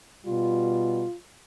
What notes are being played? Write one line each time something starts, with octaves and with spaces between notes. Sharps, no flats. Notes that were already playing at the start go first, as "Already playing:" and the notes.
B2 G3 F4